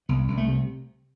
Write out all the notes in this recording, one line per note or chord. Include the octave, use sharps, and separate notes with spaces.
C2 B3
C2
A3
C3